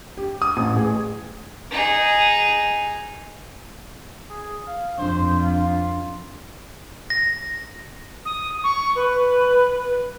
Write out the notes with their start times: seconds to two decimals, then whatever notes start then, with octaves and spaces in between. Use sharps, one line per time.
0.17 G4
0.42 D#6
0.57 A1
0.76 G#4
1.71 D#4 G#4
4.30 G#4
4.67 F5
4.98 F2 D4 C5
5.38 F4
7.10 A#6
8.25 D#6
8.63 C#6
8.95 B4